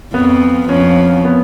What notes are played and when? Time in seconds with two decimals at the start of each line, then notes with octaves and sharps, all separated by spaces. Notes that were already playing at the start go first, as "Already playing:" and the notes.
0.13 F2 F3 B3
0.69 F2 F3 C#4
1.25 B3